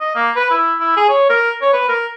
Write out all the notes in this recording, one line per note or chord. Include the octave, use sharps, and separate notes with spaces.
D#5
A#3
B4
E4
E4
G#4
C#5
A#4
C#5
B4
A#4